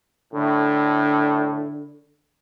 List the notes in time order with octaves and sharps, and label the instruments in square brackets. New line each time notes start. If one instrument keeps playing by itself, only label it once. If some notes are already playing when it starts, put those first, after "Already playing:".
[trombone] A2 [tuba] D3